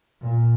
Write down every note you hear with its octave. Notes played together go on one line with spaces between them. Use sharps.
A#2